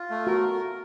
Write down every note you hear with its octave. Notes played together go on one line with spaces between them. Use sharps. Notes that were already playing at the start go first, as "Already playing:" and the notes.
Already playing: F4
A3
F#4 A#4